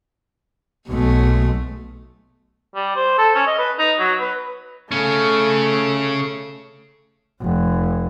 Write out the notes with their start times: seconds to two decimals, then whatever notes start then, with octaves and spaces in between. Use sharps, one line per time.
0.89 B1 B2 G#3 A3
2.75 G3
2.96 C5
3.18 A4
3.35 C#4
3.47 D#5
3.59 B4
3.78 D#4
3.99 F#3
4.20 B4
4.91 C#3 A3 C#4
7.41 F1